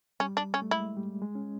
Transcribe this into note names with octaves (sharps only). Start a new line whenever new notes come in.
G3 C#4
D4
C#4
A3
G#3 E4
G3
G#3
C#4